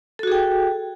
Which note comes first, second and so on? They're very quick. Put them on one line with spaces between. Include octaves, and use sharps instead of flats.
A4 F#4 G#4 G5